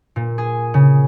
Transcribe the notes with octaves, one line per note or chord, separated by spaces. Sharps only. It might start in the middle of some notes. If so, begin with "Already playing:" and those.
A#2
G#4
C#3